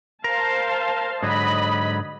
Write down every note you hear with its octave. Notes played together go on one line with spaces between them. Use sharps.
A#4 C5 F5 A5
G#2 D3 F#3 D#5 B5